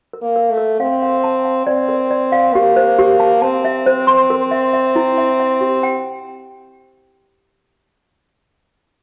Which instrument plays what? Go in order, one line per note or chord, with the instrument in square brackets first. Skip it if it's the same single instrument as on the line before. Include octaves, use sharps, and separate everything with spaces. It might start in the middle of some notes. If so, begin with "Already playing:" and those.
[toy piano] A#4
[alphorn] A#3
[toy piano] A#4
[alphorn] A3
[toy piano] A#4
[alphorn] C4 [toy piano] F5
[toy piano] F5
A5
F5
[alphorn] C4 [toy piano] D5
[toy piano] A#4
D5
F5
[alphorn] A#3 [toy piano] G4
[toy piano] C5
G4
A5
[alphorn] C4 [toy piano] A5
[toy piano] E5
C5
C6
A#4
E5
E5
E4
E5
E5
G4
G5